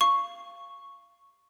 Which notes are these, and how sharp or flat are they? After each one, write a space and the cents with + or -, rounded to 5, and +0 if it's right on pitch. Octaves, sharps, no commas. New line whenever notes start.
F5 -15 C#6 +0